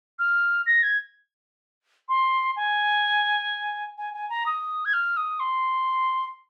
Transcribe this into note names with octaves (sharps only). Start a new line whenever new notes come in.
F6
A#6
G#6
C6
G#5
G#5
G#5
A#5
D#6
G#6
F6
D#6
C6